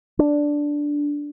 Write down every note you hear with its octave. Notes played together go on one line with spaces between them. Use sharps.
D4